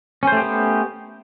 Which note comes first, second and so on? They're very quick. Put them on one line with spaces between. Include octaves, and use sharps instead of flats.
C#4 C5 A3 G4 B3